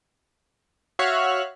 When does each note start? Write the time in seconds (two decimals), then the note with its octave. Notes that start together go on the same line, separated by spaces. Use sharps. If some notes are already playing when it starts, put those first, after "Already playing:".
0.99 F#4 C#5 E5 F5 F6 F#6